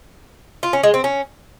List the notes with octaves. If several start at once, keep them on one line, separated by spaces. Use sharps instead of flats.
F4
C#4
G#3
C4
C#4